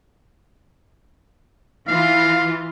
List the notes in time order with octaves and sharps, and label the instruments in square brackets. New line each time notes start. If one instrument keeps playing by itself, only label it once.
[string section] E3 F4 [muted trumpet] F5